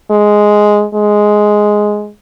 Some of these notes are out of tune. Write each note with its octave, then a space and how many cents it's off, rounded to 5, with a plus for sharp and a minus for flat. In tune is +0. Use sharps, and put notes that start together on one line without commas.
G#3 +5
G#3 +5